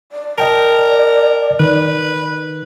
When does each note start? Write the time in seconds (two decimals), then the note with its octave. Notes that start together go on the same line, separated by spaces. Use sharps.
0.12 D5
0.38 A#4 D#5 G5 A5
1.60 D#3 B4